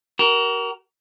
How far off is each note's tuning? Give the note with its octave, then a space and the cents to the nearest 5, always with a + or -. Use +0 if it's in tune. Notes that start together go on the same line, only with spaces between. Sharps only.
F#4 +45 A#4 +10